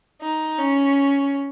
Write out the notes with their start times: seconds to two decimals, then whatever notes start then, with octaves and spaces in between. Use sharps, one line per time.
0.21 D#4
0.58 C#4